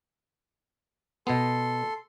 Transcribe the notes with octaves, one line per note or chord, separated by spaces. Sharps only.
B2 B3 A4 C6